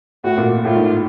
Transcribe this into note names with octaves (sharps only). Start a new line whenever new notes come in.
A2 F#4
A#2
A2 F4
G#2